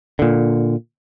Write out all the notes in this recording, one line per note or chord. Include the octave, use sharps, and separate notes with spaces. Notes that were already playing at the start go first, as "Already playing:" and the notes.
A#2 D3